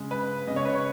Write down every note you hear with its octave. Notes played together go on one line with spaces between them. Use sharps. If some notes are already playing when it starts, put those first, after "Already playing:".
Already playing: C#3 G#3
B4
C#3 G#3 D#5
C#5
B4
C#5